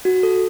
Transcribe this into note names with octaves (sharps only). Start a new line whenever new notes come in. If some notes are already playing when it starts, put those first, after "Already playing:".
F#4
A4